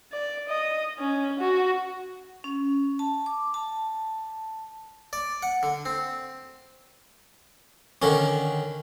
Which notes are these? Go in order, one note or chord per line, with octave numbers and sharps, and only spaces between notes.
D5
D#5
C#4
F#4
C#4
A5
D6
A5
D5
F#5
D3
C4
D3 D#3 C#4